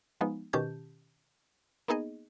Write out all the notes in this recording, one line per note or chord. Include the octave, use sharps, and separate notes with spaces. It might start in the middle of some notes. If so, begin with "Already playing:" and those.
F3 G#3 B3 D#4
B2 D#3 C#4 G4 A5 G6
A#3 B3 D#4 G#4 D#5